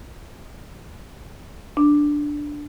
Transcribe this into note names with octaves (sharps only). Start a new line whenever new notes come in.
D4